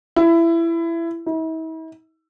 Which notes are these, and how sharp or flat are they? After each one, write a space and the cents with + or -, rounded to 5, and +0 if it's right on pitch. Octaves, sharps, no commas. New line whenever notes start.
E4 +20
E4 -45